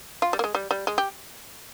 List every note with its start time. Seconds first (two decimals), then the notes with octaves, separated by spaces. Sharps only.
0.22 F4
0.33 G3
0.39 A#3
0.44 G#3
0.55 G3
0.71 G3
0.87 G#3
0.98 G4